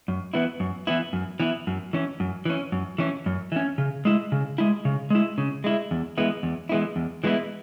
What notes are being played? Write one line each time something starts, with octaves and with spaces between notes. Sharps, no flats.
F#2
E3 B3 E4
F#2
E3 B3 E4
F#2
E3 B3 E4
F#2
E3 C#4
F#2
E3 C#4
F#2
E3 C#4
F#2
E3 C#4
C#3
G#3 E4
C#3
G#3 E4
C#3
G#3 E4
C#3
G#3 E4
E2
E3 G#3 B3 E4
E2
E3 G#3 B3 E4
E2
E3 G#3 B3 E4